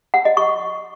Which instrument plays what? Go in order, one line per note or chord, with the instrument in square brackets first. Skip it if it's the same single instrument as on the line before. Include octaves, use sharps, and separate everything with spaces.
[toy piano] F#5
D#5
C#6